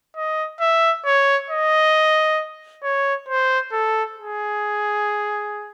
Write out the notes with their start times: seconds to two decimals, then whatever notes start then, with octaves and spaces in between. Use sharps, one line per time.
0.17 D#5
0.60 E5
1.06 C#5
1.50 D#5
2.83 C#5
3.29 C5
3.72 A4
4.17 G#4